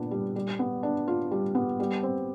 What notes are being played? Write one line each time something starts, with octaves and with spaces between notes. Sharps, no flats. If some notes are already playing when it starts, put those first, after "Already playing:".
Already playing: A#2 B3 D4
G3
G3
B3
D4
F4
G3
B3
G3
C4